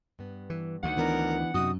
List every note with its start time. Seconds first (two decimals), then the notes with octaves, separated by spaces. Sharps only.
0.19 G2 B3
0.50 E3
0.83 D2 D#3 F#5
0.97 E3 B3 D4 A#4
1.54 F#2 C3 D#4 F#4 D#6